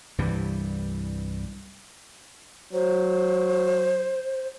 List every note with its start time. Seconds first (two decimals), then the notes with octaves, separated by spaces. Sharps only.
0.18 C2 G2 E3 G3
2.73 F#3 C5